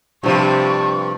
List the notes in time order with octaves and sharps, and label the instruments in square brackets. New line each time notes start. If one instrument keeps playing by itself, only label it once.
[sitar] G2 F3 [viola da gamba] C3 [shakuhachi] C#6